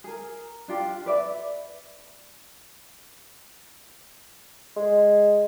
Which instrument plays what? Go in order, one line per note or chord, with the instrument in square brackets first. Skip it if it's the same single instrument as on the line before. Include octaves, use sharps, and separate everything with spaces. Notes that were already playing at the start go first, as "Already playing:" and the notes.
[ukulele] G#4 A#4
D4 F4 G4
B4 D5 E5
[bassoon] G#3